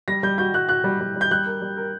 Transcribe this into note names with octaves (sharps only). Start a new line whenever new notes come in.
G3 A#6
G3 G6
F#4 G6
F#4 F#6
F#4 F#6
G3
G3
G3
G6
G3 F#6
A#4
G3
A#4